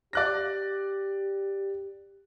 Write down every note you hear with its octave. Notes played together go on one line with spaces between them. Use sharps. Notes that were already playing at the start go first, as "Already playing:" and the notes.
G4 D5 F#6 A#6